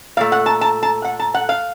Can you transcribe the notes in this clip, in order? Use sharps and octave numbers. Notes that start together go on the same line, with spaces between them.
A#2 A3 F5
F#5
A5
A5
A5
F#5
A5
F#5
F5